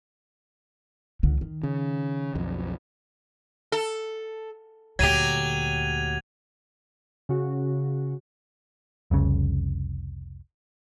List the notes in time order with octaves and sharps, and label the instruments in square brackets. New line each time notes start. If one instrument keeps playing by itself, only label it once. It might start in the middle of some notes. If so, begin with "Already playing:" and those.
[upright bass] C#2 D3
D#3
[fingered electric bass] C#3
B1 F2
[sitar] A4
[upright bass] D2 A#2 [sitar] F#3 G4 [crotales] G#6 D#7 F7
[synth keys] C#3 F#4
[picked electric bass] F1 C2 C#3